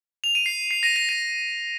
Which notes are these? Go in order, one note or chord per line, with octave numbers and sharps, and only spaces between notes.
F7
D#7
C7
C7
A#6 D#7
A#6 D#7
A#6 D#7